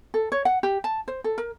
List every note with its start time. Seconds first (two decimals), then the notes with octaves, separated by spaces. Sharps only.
0.14 A4
0.32 C#5
0.45 F#5
0.63 G4
0.84 A5
1.08 C5
1.24 A4
1.38 A#4